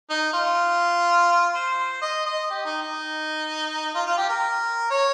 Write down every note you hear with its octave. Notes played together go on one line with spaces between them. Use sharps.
D#4
F4
C5
D#5
D#5
G4
D#4
D#4
F4
F4
G4
A#4
C#5